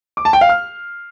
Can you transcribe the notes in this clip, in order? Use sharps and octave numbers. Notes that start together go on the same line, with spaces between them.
D6
A5
G5
F5
F6